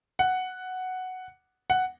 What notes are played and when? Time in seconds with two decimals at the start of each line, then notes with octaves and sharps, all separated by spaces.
0.19 F#5
1.70 F#5